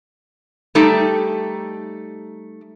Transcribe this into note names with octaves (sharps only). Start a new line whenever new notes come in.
G3 A3 D#4 G4 A4